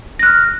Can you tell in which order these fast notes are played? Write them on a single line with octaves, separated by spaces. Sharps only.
A#6 F#6 F6